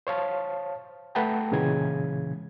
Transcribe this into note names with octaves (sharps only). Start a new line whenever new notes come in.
C5 C#5 F5 A5
A3 B4 F#5 G5 A5 A#5
A#2 C#3 E3 G#3 G#6